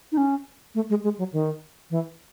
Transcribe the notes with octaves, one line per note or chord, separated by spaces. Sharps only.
D#4
C#4
A3
G#3
G#3
F#3
D#3
E3